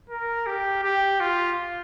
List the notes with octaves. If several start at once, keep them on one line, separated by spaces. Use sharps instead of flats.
A#4
G4
G4
F4